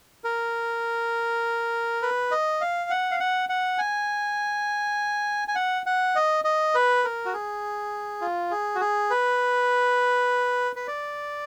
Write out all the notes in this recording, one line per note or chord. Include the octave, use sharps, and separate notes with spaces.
A#4
B4
D#5
F5
F#5
F5
F#5
F#5
G#5
G#5
F#5
F#5
D#5
D#5
B4
A#4
F#4
G#4
F4
G#4
F#4
G#4
B4
B4
D5